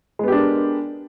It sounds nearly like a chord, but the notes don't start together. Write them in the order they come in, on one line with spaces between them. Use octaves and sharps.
G#3 B3 G4 D4 A#4